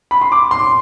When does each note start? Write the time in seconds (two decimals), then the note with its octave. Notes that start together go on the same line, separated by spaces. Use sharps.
0.11 B5
0.21 C6
0.32 D6
0.51 C6